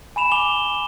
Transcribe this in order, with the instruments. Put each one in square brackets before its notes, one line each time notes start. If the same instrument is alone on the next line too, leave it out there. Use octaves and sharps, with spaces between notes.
[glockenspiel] G#5 B5 E7 F7
G#5 D6 F7 G7